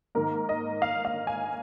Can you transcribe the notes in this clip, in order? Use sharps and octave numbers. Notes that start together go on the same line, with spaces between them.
G#2 D#3 A#3 A#4
D#5
F5
F5
G#5